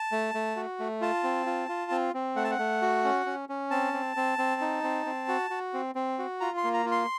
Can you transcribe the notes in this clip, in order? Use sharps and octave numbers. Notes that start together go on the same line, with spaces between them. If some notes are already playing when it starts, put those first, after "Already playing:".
Already playing: A5
A3
A3
F#4
A3
F4 A5
C4
F4
F4
C4
C4
A3 F#5
A5
F#5
A3
F#4
C#4
C#4
C#4
C4 A5
C4
C4
C4
D#4
C4
C4
F#4
F#4
C4
C4
F#4
F4 A#5
C6
A#3
A#5
F4
C6